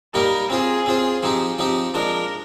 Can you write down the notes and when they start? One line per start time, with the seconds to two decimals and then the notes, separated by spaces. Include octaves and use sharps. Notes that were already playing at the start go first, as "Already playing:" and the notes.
0.14 G3 A#3 D#4 G4 A#4
0.50 C4 F4 G#4 C5
0.86 C4 F4 C5
1.23 F3 C4 D#4 G4
1.58 F3 C4 D#4 G4
1.94 F3 G#3 D4 A#4